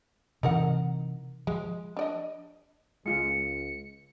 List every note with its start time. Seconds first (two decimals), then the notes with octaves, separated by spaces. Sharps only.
0.43 C3 E3 D#4 A#4 F#5
1.47 F3 G#3
1.97 D4 D5 D#5
3.06 C#2 G#3 F4 G#4 C#7